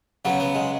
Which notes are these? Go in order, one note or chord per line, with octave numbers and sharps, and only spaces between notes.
C#3 F#3 B3
B3
G#3